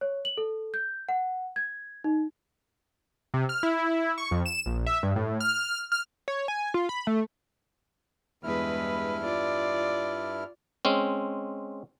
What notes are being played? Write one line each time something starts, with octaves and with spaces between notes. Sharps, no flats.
C#5
F#7
A4
G6
F#5
G#6
D#4
C3
F6
E4
C#6
F2
E7
A#1
E5
G2
A2
F6
F6
C#5
G#5
F4
B5
A3
E2 G2 G#3 E4 B4 F6
F4 D5
G#3 C4 C#4